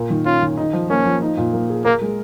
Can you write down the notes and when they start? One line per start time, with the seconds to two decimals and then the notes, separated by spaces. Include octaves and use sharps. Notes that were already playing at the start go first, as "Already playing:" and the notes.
Already playing: A#2 A#4
0.10 D#3
0.25 C#4 F4
0.42 D#3
0.57 D#4
0.73 F3
0.90 A#3 C#4
1.05 F3
1.22 D#4
1.37 A#2
1.53 A#3
1.70 G#4
1.85 A#3 A#4
2.01 G#3